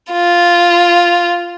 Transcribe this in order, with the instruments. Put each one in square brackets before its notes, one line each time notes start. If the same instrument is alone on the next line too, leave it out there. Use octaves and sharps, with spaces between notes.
[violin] F4